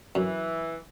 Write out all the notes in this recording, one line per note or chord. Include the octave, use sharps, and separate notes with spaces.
F#2 E3